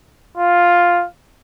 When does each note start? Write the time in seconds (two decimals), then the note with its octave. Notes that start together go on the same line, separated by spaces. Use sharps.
0.37 F4